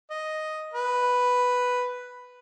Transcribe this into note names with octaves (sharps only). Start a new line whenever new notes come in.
D#5
B4